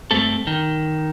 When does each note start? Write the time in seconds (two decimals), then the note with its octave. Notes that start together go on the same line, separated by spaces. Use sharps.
0.11 G2 A3 C4 A4
0.47 D#3